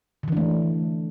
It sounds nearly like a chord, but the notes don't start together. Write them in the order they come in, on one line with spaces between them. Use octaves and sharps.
D3 E3 D4 A3